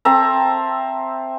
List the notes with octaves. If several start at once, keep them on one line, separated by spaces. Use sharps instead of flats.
C4 E5 A5 A#5